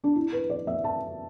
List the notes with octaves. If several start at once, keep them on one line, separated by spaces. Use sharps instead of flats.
D4
E4
B4
D5
E5
A5